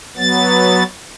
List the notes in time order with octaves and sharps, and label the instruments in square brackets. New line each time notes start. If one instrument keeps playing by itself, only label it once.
[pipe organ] F#3 B3 A6